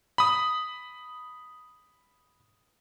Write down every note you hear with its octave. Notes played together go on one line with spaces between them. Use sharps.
B5 D#6